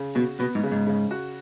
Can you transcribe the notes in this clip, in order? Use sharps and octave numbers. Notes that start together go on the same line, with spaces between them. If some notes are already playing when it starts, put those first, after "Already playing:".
Already playing: C#3
B2 F#4
B2 B3
G#2
C#3
G#2
C#3
F#4